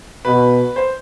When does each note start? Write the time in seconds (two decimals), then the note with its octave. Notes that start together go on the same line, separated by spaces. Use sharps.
0.25 B2 B4
0.76 C5